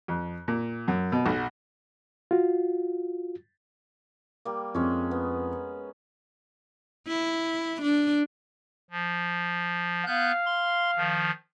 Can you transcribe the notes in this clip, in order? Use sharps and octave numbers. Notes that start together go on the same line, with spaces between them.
F2
A#2
F#2
B2
B1
F4 F#4
G3 A#3
F2 G#3 C#4
B3
E4
D4
F3
B3 F5 F#6 G6
C6
D#3 F3